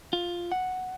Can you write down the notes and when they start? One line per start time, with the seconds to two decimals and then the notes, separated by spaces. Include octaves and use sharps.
0.13 F4
0.52 F#5